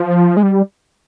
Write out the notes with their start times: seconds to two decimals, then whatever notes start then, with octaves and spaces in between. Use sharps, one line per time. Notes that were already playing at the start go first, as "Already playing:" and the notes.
Already playing: F3
0.37 G#3
0.43 G3